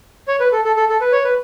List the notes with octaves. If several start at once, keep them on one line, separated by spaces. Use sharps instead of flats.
C#5
B4
A4
A4
A4
A4
B4
C#5
B4